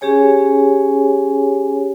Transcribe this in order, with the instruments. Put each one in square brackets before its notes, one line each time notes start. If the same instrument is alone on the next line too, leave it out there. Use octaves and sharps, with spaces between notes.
[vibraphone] C#4 G4 G#4 C#5 G#5